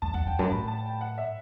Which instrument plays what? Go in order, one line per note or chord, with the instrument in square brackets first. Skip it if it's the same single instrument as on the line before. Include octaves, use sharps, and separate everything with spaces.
[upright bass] E2 [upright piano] A5
[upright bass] E2 [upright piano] F#5
[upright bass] E2 [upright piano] G5
[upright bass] F#2 [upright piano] A5
[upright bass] A2 [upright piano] B5
[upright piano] A5
G5
F#5
E5